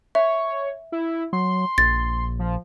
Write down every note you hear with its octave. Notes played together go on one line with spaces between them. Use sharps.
C#5 E5
E4
F#3 C6
A#1 A6
F3